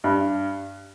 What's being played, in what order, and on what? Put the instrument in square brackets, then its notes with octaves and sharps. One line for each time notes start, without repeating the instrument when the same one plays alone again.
[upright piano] G2